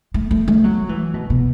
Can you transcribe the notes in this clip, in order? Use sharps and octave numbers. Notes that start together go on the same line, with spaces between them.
A3
A3
A3
F#3
E3
B2
B2